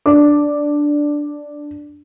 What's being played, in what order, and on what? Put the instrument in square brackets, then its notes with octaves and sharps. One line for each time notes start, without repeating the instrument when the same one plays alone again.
[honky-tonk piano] D4 D6